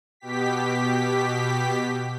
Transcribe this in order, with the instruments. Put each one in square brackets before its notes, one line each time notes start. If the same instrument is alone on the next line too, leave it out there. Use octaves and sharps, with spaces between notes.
[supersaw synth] B2 G4 B6